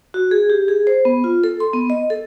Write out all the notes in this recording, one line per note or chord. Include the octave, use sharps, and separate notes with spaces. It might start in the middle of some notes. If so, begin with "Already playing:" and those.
F#4
G#4
G4
G#4
C5
B3
F4
A4
C6
B3
D#5
A4